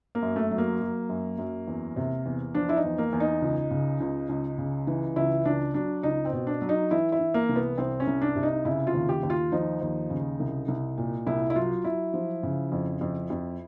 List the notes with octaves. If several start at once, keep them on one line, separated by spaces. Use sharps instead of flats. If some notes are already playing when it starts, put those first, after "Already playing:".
A#3
F#2
A3
F#3
A#3
F#3
F#2
F#2
E2
C3
E2
F3 D4
E4
D#4
E2
A#3
E2
D#4
C#2
C#3
C#2
C#2
C#3
E3
C#2 E4
C#2 D4
F#3 D4
C#2 D#4
C4
B2
D4
F#3
D#4
E3 E4
E4
E3
A#3
C2
B3
C2 C4
C#4
C2
D4
C3
D#4
C#3 E4
F4
D#2
G4
D#2
F4
F3 D#4
D#2
C#3
C2
C2
A#2
C2 E4
E4
F#3 F4
F#3 E4
F3
C#3
F2
F2
F2